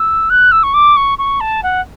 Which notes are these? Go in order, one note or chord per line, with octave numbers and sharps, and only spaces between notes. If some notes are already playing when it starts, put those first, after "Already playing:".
Already playing: E6
F#6
E6
C#6
D6
C#6
C#6
A5
F#5